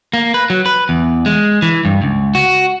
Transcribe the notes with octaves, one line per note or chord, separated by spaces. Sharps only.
A#3
B4
F#3
B4
E2
G#3
E3
G2
C#2
F#4